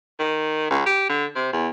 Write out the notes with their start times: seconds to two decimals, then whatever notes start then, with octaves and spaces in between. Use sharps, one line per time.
0.19 D#3
0.70 C#2
0.86 G4
1.09 D3
1.36 C3
1.52 E2